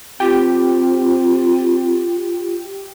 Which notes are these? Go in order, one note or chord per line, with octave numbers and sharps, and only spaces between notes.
C4 F4 G4